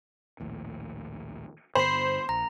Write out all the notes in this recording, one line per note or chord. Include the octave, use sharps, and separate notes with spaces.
A#1 D#2 A2
G2 D3 B3 C5 B5 C7
A#1 A#5